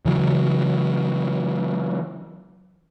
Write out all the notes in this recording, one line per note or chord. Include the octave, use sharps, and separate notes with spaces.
C#3 E3 F#3